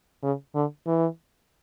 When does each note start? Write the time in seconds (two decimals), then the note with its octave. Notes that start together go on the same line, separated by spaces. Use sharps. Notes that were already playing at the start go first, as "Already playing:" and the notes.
0.23 C#3
0.55 D3
0.87 E3